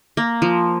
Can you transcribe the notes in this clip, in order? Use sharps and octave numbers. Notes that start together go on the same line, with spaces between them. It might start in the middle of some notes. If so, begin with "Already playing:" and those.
A#3
F3